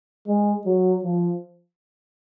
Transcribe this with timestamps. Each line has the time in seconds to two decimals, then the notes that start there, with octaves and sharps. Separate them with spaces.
0.27 G#3
0.66 F#3
1.04 F3